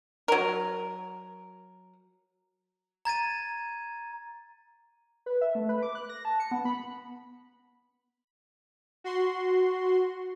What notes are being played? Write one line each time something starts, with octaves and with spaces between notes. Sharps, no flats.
F#3 A#4
A#5 G#6 A6 D#7
B4
E5
A3
B4
D6
F#6
A#6
A5
C#7
B3
B5
F#4 C6